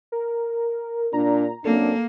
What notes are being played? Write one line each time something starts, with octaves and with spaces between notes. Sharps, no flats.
A#4
A#2 D4 A#5
F#2 A#3 C4 D4 A4